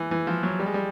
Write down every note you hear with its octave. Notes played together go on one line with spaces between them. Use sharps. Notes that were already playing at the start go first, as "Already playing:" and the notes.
Already playing: E3
E3
F3
F#3
G3
G#3
G3